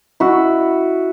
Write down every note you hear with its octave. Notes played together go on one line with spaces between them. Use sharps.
E4 F#4